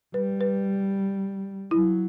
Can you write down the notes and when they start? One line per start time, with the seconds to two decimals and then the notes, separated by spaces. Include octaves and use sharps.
0.14 G3 B4
0.41 B4
1.71 F#3 E4